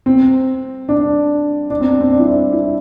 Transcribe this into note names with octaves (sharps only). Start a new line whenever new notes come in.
C4
D4
D4
C4
C4
D4
E4
D4
E4